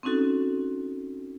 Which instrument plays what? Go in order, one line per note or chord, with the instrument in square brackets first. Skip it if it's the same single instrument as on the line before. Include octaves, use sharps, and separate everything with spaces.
[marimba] C4 C#4 D#4 F#4 A4